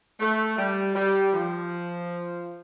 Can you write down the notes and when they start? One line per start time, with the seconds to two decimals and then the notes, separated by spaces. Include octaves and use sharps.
0.20 A3
0.58 G3
0.95 G3
1.33 F3